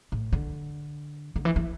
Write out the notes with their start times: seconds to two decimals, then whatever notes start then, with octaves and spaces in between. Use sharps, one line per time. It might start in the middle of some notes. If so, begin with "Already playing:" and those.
0.12 A2
0.32 D3
1.36 D3
1.45 E3
1.56 E3